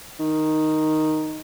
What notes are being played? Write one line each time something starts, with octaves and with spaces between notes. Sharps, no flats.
D#3